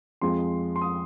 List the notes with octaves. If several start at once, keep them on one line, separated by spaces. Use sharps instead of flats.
F2 F3 G#3 C6
C6
D#6